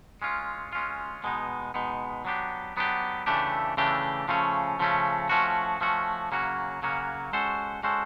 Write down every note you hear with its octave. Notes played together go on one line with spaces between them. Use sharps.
G#3 C#4 F4
G#3 C#4 F4
B2 G#3 B3 D#4
B2 G#3 B3 D#4
F#3 B3 D4 G4
F#3 B3 D4 G4
C#3 E3 A3 D4 G4
C#3 E3 A3 D4 G4
C#3 F3 A3 C#4
C#3 F3 A3 C#4
F3 A3 C#4 F#4
F3 A3 C#4 F#4
C#3 F#3 A#3 C#4 F#4
C#3 F#3 A#3 C#4 F#4
G#3 C#4 F#4 A4 C5
G#3 C#4 F#4 A4 C5